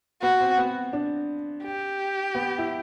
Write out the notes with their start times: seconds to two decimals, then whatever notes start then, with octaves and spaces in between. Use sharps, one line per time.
0.22 B3 F#4
0.41 C4
0.58 B3
0.93 D4
1.64 G4
2.35 B3
2.58 E4